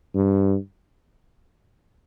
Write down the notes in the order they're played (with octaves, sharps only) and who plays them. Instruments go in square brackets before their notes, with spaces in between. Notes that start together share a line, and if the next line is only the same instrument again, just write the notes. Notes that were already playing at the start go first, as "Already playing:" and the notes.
[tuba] G2